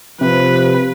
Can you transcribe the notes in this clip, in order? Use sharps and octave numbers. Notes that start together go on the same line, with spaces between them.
C3 F3 B4